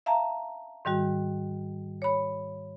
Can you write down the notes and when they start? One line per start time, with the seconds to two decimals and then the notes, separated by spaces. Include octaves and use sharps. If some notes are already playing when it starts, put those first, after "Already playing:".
0.06 E5 F5 A5 A#5
0.85 G#2 D#3 G3 F#4
2.02 C#5 B5